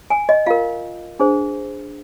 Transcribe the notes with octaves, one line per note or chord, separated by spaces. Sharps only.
G#5
D#5
F4 A#4 F5
D4 G#4 C5